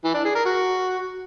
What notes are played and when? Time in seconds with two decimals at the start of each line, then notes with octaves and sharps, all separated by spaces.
0.04 E3
0.15 D4
0.25 G#4
0.35 A#4
0.46 F#4